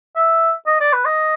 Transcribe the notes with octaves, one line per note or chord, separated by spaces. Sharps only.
E5
D#5
D5
B4
D#5